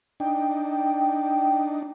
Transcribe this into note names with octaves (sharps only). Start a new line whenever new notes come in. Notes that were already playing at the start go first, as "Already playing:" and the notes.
D4 D#4 G5